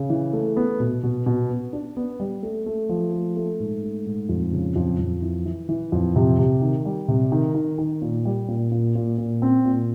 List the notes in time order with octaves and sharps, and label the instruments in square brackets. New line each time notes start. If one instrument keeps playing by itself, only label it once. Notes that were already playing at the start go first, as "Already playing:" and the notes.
Already playing: [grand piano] C#3
E3
A3
B3
B2
B2
B2
B3
D4
B3
G3
A3
A3
F3
A3
A3
G#2
A3
G#2
F2
C#3
F2
F2
E3
E3
E3
F2
C3
C3
D#3
G3
C3
D#3
D#3
D#3
A#2
G3
A#2
A#2
A#2
A#2
C4
A#2